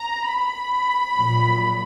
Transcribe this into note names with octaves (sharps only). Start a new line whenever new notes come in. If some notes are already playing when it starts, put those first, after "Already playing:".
Already playing: A#5
B5
A#1 A#2 F#3